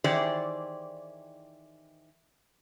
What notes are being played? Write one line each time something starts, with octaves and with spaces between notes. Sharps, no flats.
D#3 E3 G4 G#4 C5 D5